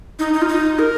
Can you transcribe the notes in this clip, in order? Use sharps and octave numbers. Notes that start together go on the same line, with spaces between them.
D#4
D#4
F4
D#4
A#4